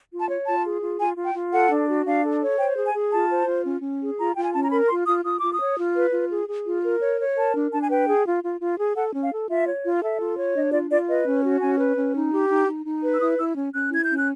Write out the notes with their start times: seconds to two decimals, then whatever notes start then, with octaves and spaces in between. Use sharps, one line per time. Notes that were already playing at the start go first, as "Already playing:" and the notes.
0.11 F4
0.20 A5
0.29 C#5
0.46 F4 A5
0.64 G#4
0.82 F4
1.00 F4 G#5
1.17 F4
1.25 G5
1.34 F4
1.53 A4 F#5
1.71 D4
1.89 F#4
2.05 D4 F5
2.23 A4
2.42 C#5
2.58 C5 G5
2.76 G#4
2.85 G#5
2.94 G#4
3.12 F4 A5
3.30 C5
3.47 F4
3.65 C#4
3.83 C#4
4.01 G#4
4.18 F4 A#5
4.35 F4 G5
4.44 G#5
4.53 C#4 A5
4.61 A#5
4.71 A#4 B5
4.89 F4 C6
5.06 F4 D#6
5.24 F4 D#6
5.38 F4 D6
5.52 D#6
5.60 C#5
5.77 F4
5.95 B4
6.13 F4
6.31 G#4
6.48 G#4
6.66 F4
6.83 A#4
7.01 C#5
7.19 C#5
7.36 A#4 A5
7.54 D4
7.72 D4 A5
7.82 G#5
7.90 B4 G5
8.07 G#4
8.25 F4
8.43 F4
8.61 F4
8.79 G#4
8.95 A4 F#5
9.14 C#4
9.22 F5
9.31 A4
9.49 F4 E5
9.67 C#5
9.84 F4
10.02 A4 E5
10.20 F4
10.37 C#5
10.55 D4 D#5
10.73 F4 D5
10.90 F4 D5
11.08 B4 D#5
11.26 C#4
11.44 F#4
11.61 C#4 G#5
11.79 B4
11.97 C#4
12.15 D#4
12.32 G4
12.50 D#4
12.67 D#4
12.85 D#4
13.03 B4
13.14 E6
13.21 E4 D#6
13.38 E4 E6
13.56 C#4
13.74 C#4 F#6
13.91 E4 G#6
14.05 C#4 G6
14.16 F#6